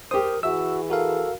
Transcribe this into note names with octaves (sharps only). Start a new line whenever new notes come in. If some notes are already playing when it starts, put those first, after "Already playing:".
G4 A#4 C5 D#6
E3 F#4 G#4 E5 E6
F#4 A4 A#4 F5